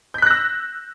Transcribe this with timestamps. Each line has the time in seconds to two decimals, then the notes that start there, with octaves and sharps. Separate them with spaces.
0.14 G6
0.18 B6
0.22 F#6
0.26 A#6
0.31 E6